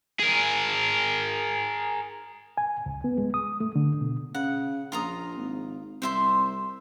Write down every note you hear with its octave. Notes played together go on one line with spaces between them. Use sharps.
G#4 A#4
G#5
C#2
B3
G#3
D#6
A3
D3
B2
C#3 F#5
A#1 F4 A#5 D#6
G#1
C2 C5 E5 C6